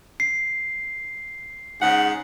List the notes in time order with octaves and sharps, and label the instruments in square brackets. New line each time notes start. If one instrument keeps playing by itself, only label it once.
[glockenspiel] C7
[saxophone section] G#2 C#3 F#5